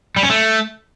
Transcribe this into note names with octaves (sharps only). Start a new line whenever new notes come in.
G3
C#4
A3